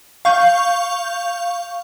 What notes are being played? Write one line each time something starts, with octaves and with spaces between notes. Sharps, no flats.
F5 C#6 G6